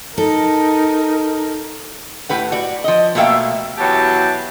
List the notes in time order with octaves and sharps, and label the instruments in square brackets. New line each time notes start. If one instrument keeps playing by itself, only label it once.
[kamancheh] D#4 A#4 [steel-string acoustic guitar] A4
[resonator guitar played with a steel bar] A2 G4 B4 F#5
F#4 D5
F3 D#5
B2 A3 A#3 E5 F5 G5
[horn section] B2 E3 F#3 G4 G5 A5